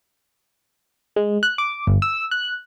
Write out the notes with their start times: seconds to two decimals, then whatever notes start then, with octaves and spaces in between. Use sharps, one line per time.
1.16 G#3
1.43 F#6
1.58 D6
1.87 G1
2.02 E6
2.31 F#6